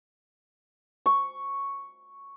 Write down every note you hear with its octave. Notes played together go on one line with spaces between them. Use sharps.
C#6